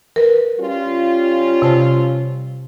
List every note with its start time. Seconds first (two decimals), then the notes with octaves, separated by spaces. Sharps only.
0.16 A#4 B4
0.60 G3 C#4 F4
1.62 C3 C5 A5